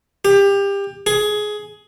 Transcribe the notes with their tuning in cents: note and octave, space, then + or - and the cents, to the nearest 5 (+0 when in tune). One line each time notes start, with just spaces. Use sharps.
G4 +25
G#4 +15